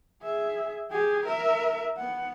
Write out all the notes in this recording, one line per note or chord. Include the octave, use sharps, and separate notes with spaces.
G#4 E5
G4 G#4
A#4 E5
B3 F#5